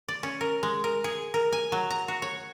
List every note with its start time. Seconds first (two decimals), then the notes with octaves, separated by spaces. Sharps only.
0.08 D5
0.23 C#4
0.41 A#4
0.63 G#3
0.84 A#4
1.04 G#4
1.34 A#4
1.52 G#5
1.72 F#3
1.90 A#5
2.08 F#4
2.22 C#5